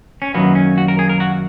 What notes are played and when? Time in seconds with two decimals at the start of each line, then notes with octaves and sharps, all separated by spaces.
0.22 C#4
0.34 F#2 D#3 F#3 A#3 B3
0.55 C#4
0.78 F#4
0.88 A#4
0.99 G#4
1.09 A#4
1.20 F#4